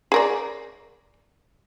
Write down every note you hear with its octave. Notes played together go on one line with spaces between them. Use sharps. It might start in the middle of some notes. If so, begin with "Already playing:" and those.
G#4 A#4 D5